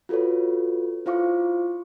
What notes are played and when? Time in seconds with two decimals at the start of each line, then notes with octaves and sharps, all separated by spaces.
0.09 F4 F#4 A4 B4 C#5
1.06 E4 F4 C5 F5 C#6 D6